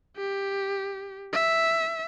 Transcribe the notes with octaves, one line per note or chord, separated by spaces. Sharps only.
G4
E5